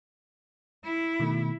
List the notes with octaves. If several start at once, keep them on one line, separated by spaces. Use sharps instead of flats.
E4
B2 D#3 A3